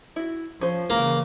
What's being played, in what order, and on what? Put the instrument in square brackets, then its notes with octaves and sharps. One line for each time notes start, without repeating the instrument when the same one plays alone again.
[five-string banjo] E4 F#4
[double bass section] F3 [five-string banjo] C#4 C5
[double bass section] C#3 E3 [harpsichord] A#3 [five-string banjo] B4